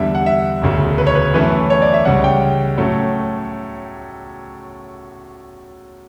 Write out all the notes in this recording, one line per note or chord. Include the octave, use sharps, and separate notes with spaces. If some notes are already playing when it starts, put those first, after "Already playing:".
Already playing: E2 D3 G3 E5
F#5
E5
E1 D2 C#3
B4
C#5
B4
F#2 E3 A3 C#4 E4 B4
C#5
D5
E5
C#2 C#3 G3 C#4 F#5
G5
A2 F#3 A3 C#4